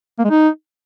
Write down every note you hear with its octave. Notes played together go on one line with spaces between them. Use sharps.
A#3
G#3
D#4